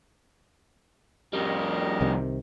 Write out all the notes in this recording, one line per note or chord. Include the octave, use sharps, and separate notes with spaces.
F2 G3 G4 A#4 D#5
C2 C3 D#3